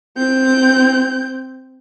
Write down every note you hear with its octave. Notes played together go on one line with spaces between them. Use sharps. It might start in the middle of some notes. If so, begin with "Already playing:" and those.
C4 G6